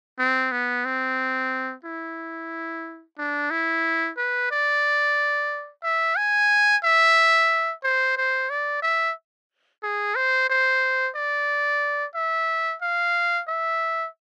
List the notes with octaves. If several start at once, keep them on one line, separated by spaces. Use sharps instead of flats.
C4
B3
C4
E4
D4
E4
B4
D5
E5
G#5
E5
C5
C5
D5
E5
G#4
C5
C5
D5
E5
F5
E5